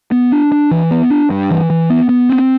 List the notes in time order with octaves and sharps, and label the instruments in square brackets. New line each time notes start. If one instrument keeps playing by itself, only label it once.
[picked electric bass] B3
D4
D4
E3
B3
D4
G2
E3
E3
B3
B3
C4